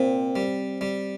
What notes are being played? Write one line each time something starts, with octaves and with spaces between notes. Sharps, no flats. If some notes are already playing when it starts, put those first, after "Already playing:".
Already playing: A#2 C4
G3
G3